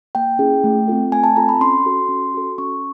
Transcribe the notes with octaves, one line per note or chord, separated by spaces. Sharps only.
A#3 G5
C#4 E4 G#4
A3
C4 F4 A4
A3 G#5
A5
C4 F4 A4 A#5
B5
C#4 C6
F#4 A4
C#4
F#4 A4
C#4 C#6